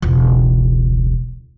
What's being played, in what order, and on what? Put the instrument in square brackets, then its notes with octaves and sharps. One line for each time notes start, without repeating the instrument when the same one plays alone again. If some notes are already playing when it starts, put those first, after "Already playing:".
[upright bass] E1 C#2